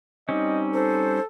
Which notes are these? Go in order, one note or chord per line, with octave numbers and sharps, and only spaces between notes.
G3 C4 C#4 D#4 D#5
A4 C5